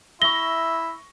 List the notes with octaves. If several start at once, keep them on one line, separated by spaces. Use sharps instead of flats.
E4 E5 C#6 A#6 G7